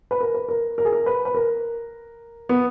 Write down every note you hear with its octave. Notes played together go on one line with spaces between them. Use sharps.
B4
A#4
B4
A#4
A#4
G#4
A#4
B4
B4
A#4
B3